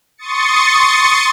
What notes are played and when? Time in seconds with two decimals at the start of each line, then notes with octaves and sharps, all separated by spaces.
0.18 C6 C#6 D#6 A6 C#7